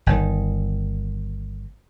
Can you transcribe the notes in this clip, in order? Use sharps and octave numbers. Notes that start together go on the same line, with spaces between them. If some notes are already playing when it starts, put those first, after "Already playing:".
G1 D#3